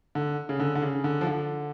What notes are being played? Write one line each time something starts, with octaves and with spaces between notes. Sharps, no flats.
D3
C#3
D3
D3
C#3
D3
F3
D3